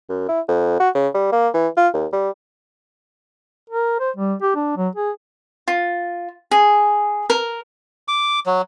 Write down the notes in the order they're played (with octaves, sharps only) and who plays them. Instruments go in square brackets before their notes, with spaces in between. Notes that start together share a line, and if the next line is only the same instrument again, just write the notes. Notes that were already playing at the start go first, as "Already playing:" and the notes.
[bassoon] F#2
E4
F2
F#4
C#3
G3
A#3
E3
F4
D#2
G3
[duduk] A#4
C5
G3
G4
D4
F#3
G#4
[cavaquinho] F4
G#4
A#4
[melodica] D6
F#3